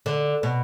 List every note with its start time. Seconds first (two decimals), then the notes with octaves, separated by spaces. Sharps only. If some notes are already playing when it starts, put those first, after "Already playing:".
0.06 D3
0.43 B2